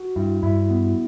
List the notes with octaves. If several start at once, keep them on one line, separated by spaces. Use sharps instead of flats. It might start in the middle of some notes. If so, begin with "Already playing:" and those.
Already playing: F#4
G2 E4
G2 E4
B3